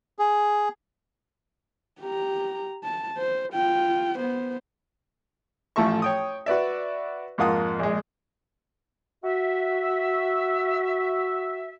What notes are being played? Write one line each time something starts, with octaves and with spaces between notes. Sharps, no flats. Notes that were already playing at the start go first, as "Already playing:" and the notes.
G#4
G4 A#5
A5
C5
F4 G5
B3 C5
A1 F3 A3 A4 E5 C#6
C#5 G5 D#6
F#4 B4 D5 E5
F2 G#2 A#3 F4 F#5 D#6
A#1 G#3
F#4 E5